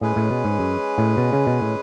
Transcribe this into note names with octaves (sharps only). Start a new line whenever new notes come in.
A2 G#3 C#4 G#4 B4
A2
B2
G#2
F#2
A2
B2
C#3
B2
A2